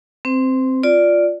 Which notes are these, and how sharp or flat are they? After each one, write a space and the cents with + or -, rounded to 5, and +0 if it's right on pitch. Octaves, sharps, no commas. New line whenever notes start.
C4 +0 C5 -30
F4 +0 D5 +0